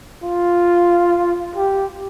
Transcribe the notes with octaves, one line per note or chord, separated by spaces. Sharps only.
F4
G4